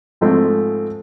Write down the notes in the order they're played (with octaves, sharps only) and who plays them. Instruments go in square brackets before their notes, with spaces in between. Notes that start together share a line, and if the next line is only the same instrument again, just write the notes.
[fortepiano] G#2 F3 G#3 A3 C4